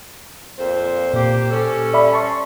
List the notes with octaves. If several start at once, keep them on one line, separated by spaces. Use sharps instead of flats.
F2 A#2 C5
A#2 A#3 G4 C5
G3 C#4 A4
D5 E5 B5
A5 C6 C#6